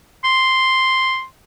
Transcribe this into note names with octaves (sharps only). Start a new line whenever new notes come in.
C6